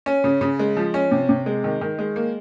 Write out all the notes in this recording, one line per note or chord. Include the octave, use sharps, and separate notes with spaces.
C#4
C#3
C#3
G#3
F3
C#4
C3
C3
G#3
D#3
D#3
G#3
A#3